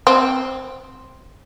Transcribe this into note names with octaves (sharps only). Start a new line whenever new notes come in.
C4